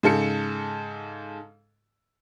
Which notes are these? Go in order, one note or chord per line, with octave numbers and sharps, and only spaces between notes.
G#2 C#3 A4 C#7